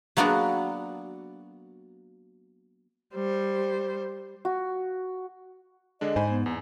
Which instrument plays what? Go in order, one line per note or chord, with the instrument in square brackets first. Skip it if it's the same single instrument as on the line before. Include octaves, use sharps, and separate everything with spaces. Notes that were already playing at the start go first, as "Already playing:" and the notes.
[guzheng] F#3 A#3 B3 D4 F#4
[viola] G3 C5
[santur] F#4
[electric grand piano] D3 G#3 D4 [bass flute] D#5
[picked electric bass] G#2 [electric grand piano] C5 G#5 B5
[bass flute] B3
[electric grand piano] E2